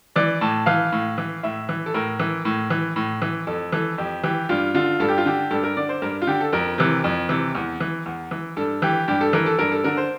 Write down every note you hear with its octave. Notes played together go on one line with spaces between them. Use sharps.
E3 D5
A2 A5
E3 F5
A2
E3
A2 E5
E3
A4
A2 A#4
E3
A2
E3
A2
E3
F2 A4
E3 A4
F2 G4
E3 G4
G2 F4
D3 F4
G2 A4
G4
F4
D3 G4
G2 A4
A#4
D3 D5
C5
G2 A#4
F4
D3 G4
A4
F2 A#4
C3 E3
F2
C3 E3
E2
E3
E2
E3
G2 A4
E3 G4
G2 G4
A4
E3 A#4
A4
G2 A#4
A4
D3 A#4
C5